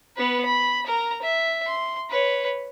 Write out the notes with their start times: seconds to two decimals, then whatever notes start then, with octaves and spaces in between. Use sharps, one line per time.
0.16 B3 B4
0.45 B5
0.86 A#4 A#5
1.22 E5
1.66 C6
2.10 B4 C#5